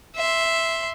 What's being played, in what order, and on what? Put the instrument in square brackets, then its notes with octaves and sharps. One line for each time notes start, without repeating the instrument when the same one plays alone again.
[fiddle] E5 C6